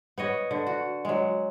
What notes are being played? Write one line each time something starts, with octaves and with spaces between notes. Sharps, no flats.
B3 C#5 D#5
D3
F#4
F#3 G#3